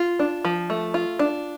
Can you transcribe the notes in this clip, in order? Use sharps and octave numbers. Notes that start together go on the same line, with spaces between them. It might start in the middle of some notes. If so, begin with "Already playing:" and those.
Already playing: F4
D4
F3
A3
F4
D4